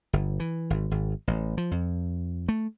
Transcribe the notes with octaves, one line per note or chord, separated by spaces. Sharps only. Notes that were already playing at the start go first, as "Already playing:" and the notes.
G1
E3
G#1
G#1
A1
F3
F2
A3